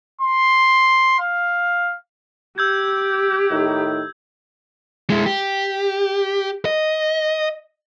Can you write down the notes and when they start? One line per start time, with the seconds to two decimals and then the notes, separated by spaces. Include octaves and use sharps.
0.21 C6
1.20 F5
2.58 G4 E6 G6 G#6
3.50 A2 D#3 D#4
5.10 G#3 E4
5.26 G4
6.65 D#5